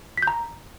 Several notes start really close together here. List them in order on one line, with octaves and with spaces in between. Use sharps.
B6 G6 A#5